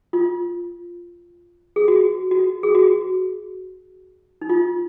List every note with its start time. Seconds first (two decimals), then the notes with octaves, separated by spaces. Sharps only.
0.13 F4
1.76 G#4
1.88 F#4
2.31 F#4
2.63 G#4
2.75 F#4
4.41 D#4
4.49 F4